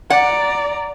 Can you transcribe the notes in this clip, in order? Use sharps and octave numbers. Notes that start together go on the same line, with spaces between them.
D5 F#5 A#5